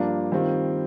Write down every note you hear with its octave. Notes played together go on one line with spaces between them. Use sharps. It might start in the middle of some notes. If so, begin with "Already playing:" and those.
Already playing: G2 F3 A#3 D4 F4
D#3 G3 C4 F4